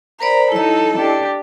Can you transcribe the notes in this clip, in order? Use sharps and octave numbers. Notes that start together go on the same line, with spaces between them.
A#4 C5 D5 A#5 B5
F#3 D#4 E4 A4 D#5
D4 G4